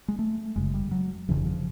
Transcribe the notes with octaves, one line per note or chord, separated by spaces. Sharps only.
G#3
A3
F#1 F#2 C#3 G#3
G3
F#3
G1 F2 C#3 E3
F3